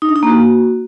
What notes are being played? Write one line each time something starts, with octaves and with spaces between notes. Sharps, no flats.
D#4
D4
D#4
A#3
F#4